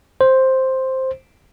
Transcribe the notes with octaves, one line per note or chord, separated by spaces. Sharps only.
C5